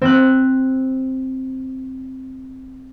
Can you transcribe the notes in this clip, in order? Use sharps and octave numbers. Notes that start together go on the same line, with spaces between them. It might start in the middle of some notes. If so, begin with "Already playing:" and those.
C4 F#6